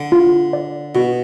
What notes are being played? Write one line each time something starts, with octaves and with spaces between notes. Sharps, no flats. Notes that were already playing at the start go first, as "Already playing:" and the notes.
Already playing: D3
F4
D5
B2 F#4